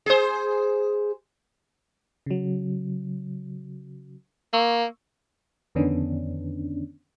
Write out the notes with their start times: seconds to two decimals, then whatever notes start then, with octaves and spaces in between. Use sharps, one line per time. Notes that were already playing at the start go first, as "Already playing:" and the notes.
0.06 G#4 C5
2.26 C#3 F#3
4.53 A#3 C#6 E6
5.75 F2 D3 D#3 B3 C#4 D4